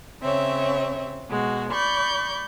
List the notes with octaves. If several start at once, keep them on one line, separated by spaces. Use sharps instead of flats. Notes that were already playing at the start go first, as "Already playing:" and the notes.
C#3 C4 C#5 E5
B2 G#3 F#4
D5 B5 C#6 G6